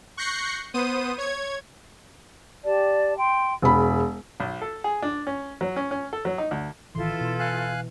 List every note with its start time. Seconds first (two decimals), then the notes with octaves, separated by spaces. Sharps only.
0.17 C#6 F#6 G6 A#6 C7 C#7
0.74 B3 C5 D#6 D#7
1.18 C#5 G#6
2.65 G4 D5 A5
3.17 G5 C6
3.62 E1 G#4 B5
4.40 B1
4.62 A4
4.84 G#4
5.02 D4
5.27 C#4
5.61 F#3
5.76 C#4
5.91 C#4
6.13 A4
6.25 F#3
6.38 D#4
6.51 D2
6.95 A1 D#3 E3 E4 F4 A4 C6
7.21 B2
7.40 F5 G#5 F#6